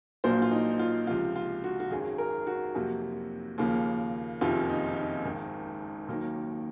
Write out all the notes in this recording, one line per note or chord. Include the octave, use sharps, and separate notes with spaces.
A#1 A#2 F#3 A#3 C5
F4
D#4
F4
C#2 C3 F3 F4
F4
F#4
F#4
G#1 F#2 D#3 G#4
A#4
F#4
F2 C3 F#3 A#3
D#2 C#3 F3 A#3
F#1 F2 C3 D#3 F4
D#4
D#4
G#1 G#2 D#3
D#2 D#3 F#3 A#3